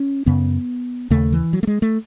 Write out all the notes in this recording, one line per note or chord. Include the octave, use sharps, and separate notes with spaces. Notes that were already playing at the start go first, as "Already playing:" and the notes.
Already playing: C#4
F#2 C#3 B3
D#2 C#3 A3
E3
F#3
A3
G#3
A3